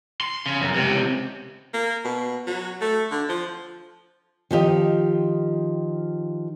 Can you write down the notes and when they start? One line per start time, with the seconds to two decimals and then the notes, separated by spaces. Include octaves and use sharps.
0.21 C6
0.46 C#3
0.61 F#2
0.73 C#2 C3
1.74 A#3
2.04 B2
2.47 F#3
2.81 A3
3.11 D3
3.29 F3
4.51 D#3 F3 G4 D#5